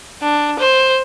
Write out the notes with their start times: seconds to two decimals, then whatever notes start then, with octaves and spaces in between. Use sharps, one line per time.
0.22 D4
0.59 C5